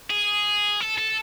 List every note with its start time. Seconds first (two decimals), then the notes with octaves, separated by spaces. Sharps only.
0.11 G#4
0.81 A4
0.98 A4